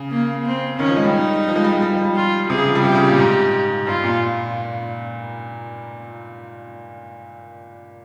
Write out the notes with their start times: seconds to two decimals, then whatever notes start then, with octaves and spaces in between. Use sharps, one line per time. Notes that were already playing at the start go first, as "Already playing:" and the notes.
Already playing: C#3
0.11 A#3
0.45 C4
0.79 D#3 C#4
0.87 F3
0.96 G#3
1.04 G3
1.13 D#4
1.48 F3
1.56 G#3
1.64 G3
1.72 G#3
1.82 G3
1.93 F3
2.05 G3
2.16 F4
2.50 C3 G#4
2.58 C#3
2.67 F3
2.75 G3
2.84 C3 G4
2.95 C#3
3.07 A#2
3.19 G#2
3.87 G2 F4
4.04 A#2